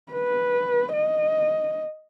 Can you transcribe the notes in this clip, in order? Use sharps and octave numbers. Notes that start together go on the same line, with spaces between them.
B4
D#5